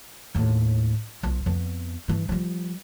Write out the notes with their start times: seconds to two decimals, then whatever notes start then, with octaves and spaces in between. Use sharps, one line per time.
0.35 D#2 A2
1.23 B1 F4
1.46 F2 B3
2.08 G2 E3
2.29 F3 G3